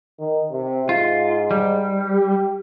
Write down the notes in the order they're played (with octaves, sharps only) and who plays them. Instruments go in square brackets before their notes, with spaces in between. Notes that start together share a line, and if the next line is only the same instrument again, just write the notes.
[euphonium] D#3
C3
[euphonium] G#2 [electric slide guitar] F4
[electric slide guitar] G3
[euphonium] G4